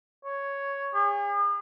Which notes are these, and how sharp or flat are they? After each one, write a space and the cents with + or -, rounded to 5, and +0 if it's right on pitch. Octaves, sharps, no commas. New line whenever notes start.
C#5 +5
G#4 -45